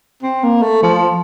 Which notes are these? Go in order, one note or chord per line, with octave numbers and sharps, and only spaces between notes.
C4
A#3
A3
F3